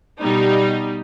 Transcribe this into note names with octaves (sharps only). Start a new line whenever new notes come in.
B2 G3 D#4